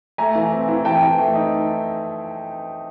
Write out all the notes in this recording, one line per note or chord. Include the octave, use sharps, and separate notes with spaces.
A3 G#5 A#5
E3
C4
E3
E3 G5 A5
E3
A3
D#4